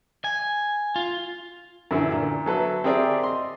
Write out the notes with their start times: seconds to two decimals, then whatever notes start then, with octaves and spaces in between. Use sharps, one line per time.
0.24 G#5
0.96 F4
1.91 F#2 A#2 D3 E3
2.12 A#2
2.46 F#3 A4 B4 E5
2.84 C4 G4 G#4 A#4 D5 E5
3.23 D#5 C6